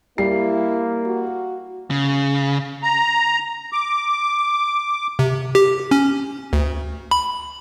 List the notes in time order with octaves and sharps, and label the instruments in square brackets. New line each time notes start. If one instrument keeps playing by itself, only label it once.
[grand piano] G3 C7 [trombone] A#3 [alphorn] E4
[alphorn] F#4
[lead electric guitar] C#3
[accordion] A#5
D6
[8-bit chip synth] C3
G4
C#4
D2
B5